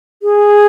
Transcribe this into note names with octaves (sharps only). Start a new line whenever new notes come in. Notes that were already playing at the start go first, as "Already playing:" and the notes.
G#4